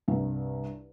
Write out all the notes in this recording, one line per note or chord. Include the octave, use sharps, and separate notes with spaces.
C2 G2